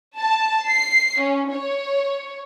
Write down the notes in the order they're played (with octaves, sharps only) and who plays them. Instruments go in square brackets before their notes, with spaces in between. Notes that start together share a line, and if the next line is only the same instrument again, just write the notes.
[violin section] A5
C7
C#4
C#5